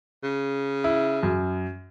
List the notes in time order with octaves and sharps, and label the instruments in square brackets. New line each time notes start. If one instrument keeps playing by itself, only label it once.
[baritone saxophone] C#3
[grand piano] E4
F#2